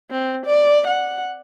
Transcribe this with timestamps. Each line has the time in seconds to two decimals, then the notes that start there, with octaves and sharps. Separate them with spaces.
0.11 C4
0.46 D5
0.87 F#5